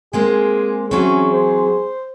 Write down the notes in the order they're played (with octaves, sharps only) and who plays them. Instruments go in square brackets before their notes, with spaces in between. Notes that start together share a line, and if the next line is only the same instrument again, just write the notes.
[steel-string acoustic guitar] G#3 A#3 C4 [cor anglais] G#4
[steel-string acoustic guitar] E3 F#3 C4 [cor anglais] C#4 [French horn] G#4
[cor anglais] C5